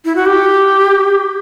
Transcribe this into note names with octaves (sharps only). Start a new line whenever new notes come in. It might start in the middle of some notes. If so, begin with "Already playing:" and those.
E4
F#4
G4